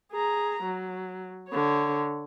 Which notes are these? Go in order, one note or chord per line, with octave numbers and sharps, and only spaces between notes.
G#4 A#5
F#3
D3 C#5